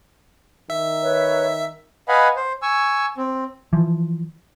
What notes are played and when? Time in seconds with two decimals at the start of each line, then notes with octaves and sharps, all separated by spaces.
0.70 D#3 E5
1.02 B4 C#5
2.08 B4 D#5 F5 F#5 G#5 B5
2.36 C5
2.62 G#5 C#6 E6
3.17 C4
3.73 E3 F3